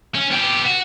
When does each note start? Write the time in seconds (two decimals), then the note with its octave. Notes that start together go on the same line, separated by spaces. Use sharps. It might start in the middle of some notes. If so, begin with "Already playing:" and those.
0.15 C#4
0.31 B3 G4
0.66 F#4